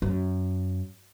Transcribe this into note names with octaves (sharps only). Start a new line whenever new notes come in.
F#2